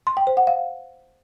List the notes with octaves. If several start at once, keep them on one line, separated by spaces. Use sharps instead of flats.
C6
G5
C5
F#5
F5